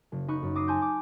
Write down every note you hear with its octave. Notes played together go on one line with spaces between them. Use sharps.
F#1
D#4 B5 C#6 F#6
F#2
D6 D#6 A#6 C7 D#7
G#5 A5 C6 G6
D6